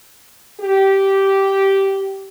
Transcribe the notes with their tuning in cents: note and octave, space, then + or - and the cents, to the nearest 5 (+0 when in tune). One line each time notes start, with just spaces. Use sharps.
G4 -10